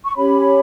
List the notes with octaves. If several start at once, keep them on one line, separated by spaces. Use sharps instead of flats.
C#6
C#4 G4 C#5 B5